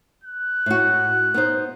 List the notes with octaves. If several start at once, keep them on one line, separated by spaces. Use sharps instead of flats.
F#6
A2 F#4
B3 D#4 C5